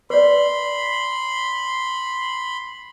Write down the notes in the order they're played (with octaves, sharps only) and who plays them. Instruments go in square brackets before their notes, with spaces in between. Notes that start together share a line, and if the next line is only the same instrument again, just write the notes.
[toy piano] B4 D5 [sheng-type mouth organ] B5 C6